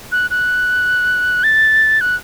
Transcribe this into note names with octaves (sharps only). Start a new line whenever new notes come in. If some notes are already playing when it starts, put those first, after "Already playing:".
F#6
F#6
A6
F#6